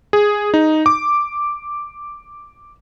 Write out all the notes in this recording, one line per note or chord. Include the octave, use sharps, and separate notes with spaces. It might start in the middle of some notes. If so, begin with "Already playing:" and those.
G#4
D#4
D6